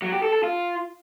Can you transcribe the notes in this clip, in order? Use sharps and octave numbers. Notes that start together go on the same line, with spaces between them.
F#3
G4
A4
A4
F4